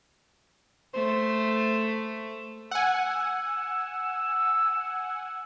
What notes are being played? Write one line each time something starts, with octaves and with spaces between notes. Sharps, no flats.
A3 C5
F#5 G#5 E6